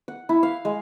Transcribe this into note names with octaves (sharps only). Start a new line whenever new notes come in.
F#5
E4
F5
G#3